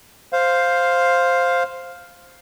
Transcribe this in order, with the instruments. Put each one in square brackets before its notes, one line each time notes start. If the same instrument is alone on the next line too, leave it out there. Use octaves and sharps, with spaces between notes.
[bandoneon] C5 F5